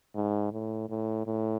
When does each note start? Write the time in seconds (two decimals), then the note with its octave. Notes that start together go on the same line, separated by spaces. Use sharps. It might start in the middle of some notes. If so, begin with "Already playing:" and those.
0.15 G#2
0.52 A2
0.89 A2
1.26 A2